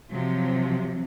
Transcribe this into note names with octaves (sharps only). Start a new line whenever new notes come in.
C3 F3 F#3